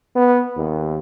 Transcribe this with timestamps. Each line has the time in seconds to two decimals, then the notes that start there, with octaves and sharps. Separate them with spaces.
0.16 B3
0.57 D#2